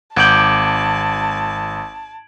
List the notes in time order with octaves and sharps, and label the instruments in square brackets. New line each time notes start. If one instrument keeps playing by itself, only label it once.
[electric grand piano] G#1 [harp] F#5 D6 G6 [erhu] A5 [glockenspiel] G#6 D7 F#7